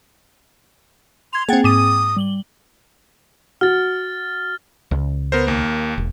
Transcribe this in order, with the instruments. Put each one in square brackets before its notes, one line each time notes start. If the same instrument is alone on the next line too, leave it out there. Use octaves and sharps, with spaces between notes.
[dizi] C6 [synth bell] G#6 F7
[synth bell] A#3 G5 A6 [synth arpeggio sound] C4 G#4 [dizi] F#5
[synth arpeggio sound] G#2 D#7 [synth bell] D6 [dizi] D#6
[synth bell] G3 F#7 G7
[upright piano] F#4 [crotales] F6 A6
[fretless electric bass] C#2
[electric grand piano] B3 A#4 C5
D#2 A#3
[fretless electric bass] E1